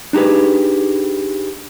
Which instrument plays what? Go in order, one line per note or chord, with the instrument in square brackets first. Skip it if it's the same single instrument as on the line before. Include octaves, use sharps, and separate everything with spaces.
[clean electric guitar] D4 D#4 G4 G#4 B4